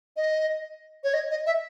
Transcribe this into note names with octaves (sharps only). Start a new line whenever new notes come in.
D#5
C#5
D#5
D#5
E5